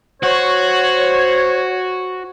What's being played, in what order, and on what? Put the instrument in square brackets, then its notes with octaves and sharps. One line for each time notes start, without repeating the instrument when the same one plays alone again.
[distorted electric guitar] F#4 [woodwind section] C5 C#5